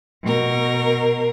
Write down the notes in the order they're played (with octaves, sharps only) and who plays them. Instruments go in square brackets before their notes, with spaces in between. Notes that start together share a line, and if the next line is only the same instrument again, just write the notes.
[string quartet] B2 A#4